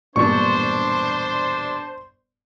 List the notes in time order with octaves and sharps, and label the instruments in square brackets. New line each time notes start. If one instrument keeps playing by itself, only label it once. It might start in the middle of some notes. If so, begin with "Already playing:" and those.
[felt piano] E1 A#1 G2 [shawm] D4 [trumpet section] C5 [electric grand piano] C#6